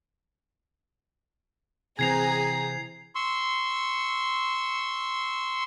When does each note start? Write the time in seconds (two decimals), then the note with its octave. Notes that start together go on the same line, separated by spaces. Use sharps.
1.99 C3 E3 C4 G#4 A#5 G#6 C7 F7
3.15 C6 C#6 E6